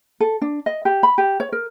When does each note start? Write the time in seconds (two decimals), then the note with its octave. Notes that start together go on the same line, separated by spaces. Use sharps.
0.20 A4
0.42 D4
0.66 D#5
0.85 G4
1.03 B5
1.18 G4
1.40 C#5
1.52 A#4